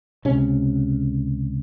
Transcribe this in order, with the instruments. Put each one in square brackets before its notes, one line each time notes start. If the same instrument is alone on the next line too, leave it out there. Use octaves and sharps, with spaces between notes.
[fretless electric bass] C#2 C3 C#4